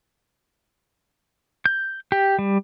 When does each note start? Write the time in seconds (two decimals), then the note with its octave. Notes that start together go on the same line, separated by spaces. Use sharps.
1.66 G6
2.12 G4
2.39 G3